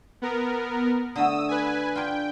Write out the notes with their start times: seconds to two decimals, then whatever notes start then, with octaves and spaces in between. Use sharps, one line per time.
0.22 B3 A#4
1.16 D3 A3 D#6 E6
1.49 B4 G#5
1.95 D4 F4 G5